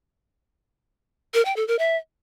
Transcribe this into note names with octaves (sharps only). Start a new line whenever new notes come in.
A#4
G5
A4
A#4
E5